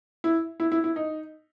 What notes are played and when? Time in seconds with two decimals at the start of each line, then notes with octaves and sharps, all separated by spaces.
0.24 E4
0.60 E4
0.72 E4
0.84 E4
0.96 D#4